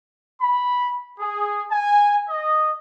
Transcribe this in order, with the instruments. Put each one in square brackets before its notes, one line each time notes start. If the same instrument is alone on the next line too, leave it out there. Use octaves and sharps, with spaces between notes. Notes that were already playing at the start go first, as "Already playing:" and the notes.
[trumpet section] B5
G#4
G#5
D#5